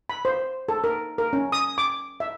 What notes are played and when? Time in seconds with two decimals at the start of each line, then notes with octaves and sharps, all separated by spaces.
0.10 B5
0.25 C5
0.69 A4
0.84 A#4
1.18 A#4
1.33 C#4
1.52 D#6
1.78 D6
2.20 E5